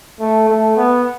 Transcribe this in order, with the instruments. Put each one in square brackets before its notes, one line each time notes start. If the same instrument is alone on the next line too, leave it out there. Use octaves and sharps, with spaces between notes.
[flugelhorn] A3
A3
B3